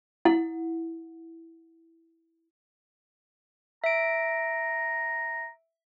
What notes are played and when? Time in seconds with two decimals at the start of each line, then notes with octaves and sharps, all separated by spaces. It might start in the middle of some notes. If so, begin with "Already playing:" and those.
0.25 E4 F#5
3.84 E5 A#5 D7